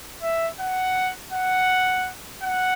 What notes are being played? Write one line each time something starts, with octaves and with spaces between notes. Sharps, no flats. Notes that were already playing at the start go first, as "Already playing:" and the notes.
E5
F#5
F#5
F#5